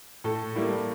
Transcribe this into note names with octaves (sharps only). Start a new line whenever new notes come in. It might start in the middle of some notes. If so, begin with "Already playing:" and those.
A2 A4
G3 A#3 E4